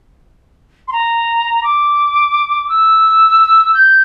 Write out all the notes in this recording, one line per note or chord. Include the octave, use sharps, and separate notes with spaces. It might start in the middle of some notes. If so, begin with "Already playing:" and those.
C6
A#5
D6
E6
G6